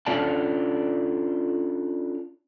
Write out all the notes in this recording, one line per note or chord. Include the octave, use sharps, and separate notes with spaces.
C#4 D4 F4 A4 D5 A5